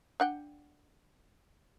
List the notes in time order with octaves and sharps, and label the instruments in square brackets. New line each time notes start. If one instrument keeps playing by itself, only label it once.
[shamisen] D4 F#5 G5